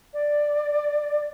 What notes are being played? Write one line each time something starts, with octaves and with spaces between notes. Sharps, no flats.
D5